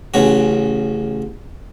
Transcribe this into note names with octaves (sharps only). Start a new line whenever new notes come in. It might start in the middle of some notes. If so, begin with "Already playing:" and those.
A1 C#3 F#4